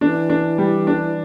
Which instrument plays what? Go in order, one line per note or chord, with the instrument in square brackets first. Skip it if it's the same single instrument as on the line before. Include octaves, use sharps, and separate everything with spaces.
[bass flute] E3 [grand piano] D4
[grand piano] D4
G3
D4